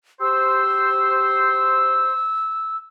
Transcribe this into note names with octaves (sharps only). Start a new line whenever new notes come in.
G4 C5 E6